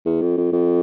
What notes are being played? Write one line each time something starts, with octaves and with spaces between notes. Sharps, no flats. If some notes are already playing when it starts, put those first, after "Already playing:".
E2
F2
F2
F2